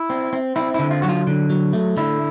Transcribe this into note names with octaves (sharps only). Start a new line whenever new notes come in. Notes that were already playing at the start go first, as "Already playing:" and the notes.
Already playing: E4
C4
C4
C4 E4
D3 E4
F4
F#3 F#4
F4
D3
F#3
A3
D3 E4